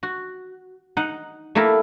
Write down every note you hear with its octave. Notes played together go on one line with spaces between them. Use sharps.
F#4
D#4 F#5
A3 A#3 E4 G4 A#4